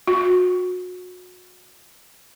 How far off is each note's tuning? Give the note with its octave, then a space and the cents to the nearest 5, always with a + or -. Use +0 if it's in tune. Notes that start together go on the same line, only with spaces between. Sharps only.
F#4 -30